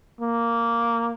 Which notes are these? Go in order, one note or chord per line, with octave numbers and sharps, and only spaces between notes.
A#3